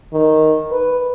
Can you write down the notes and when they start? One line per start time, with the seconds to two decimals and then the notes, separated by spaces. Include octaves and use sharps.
0.13 D#3
0.71 B4